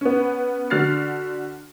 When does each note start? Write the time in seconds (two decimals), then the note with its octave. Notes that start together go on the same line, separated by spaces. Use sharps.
0.01 B3 C#4
0.70 D3 F#4 F6 A6 C7